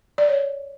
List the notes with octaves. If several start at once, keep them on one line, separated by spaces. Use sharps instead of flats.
D5
C#5